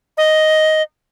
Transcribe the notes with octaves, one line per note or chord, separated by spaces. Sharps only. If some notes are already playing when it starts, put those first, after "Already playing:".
D#5